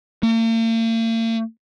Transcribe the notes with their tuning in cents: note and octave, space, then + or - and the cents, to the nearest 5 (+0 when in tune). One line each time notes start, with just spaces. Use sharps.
A#3 -45